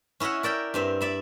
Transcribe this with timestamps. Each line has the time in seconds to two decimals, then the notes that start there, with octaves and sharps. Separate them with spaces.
0.20 C#4 E4 D#5 E5 F#5
0.43 A#4 D5 E5 G5
0.74 G2 C4 E5
1.01 D5 E5 B5